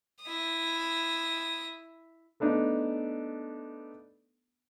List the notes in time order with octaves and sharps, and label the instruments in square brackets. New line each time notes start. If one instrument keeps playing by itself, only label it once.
[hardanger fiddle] E4 D#6
[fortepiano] A3 B3 D4 D#4